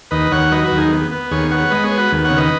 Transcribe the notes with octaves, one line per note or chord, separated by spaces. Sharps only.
D#2 B4 D#5
D#2 C#5 F#5
F#3 B4 D#5
F#4 B4
D#2
D#4 G#4
B3
B3
D#2 G#4 C#5
B3 C#5 F#5
G#3 B4 D#5
G#4 C#5
B3
F#4 B4
D#2
C#5 F#5
C#3
B4 D#5